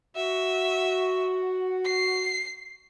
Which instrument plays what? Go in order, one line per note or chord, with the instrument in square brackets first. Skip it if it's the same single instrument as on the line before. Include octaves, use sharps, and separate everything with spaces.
[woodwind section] F#4 [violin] E5
[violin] C7